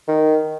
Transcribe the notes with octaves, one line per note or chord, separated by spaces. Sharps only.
D#3